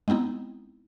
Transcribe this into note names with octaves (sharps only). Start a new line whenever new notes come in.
G#3 B3 C4 D#4 E4